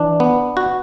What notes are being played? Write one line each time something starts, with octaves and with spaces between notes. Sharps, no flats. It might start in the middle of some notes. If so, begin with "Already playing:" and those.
Already playing: E3 D4
B3
F#4